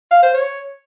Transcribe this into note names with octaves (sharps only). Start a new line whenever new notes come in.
F5
C5
C#5